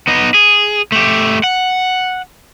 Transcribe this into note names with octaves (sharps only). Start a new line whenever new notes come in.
B3 D#4
G#4
A3 G4
F#5